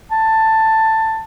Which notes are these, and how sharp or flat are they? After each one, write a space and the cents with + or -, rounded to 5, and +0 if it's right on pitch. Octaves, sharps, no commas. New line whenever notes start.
A5 +10